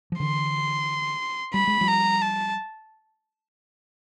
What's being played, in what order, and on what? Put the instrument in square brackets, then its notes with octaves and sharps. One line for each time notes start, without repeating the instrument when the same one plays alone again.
[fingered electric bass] F3
[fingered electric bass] D3 E3 [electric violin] C6
[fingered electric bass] G3 [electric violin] B5
[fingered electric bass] G#3
F3 G3
[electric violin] A#5
A5